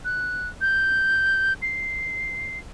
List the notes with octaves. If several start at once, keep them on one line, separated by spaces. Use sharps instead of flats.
F#6
G6
C7